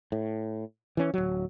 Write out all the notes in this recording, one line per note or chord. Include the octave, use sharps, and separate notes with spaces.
A2
E3 C#4
D1 F#3